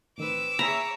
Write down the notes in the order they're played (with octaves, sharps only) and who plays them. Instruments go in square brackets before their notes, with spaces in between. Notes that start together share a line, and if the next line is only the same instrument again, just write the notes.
[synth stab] A2 D#3 [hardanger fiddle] C4 B4 [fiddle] D6 E6
[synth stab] G#4 E5 B5 [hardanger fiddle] C#5 [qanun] A#5